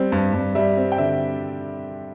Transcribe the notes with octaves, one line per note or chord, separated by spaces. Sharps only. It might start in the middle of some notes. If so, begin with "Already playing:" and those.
Already playing: G3 C4
G2
G2
G3 E5
C4
G5
D3 E5